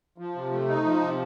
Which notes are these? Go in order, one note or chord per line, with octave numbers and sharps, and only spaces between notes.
F3
C3
A3
D#4
F3
C3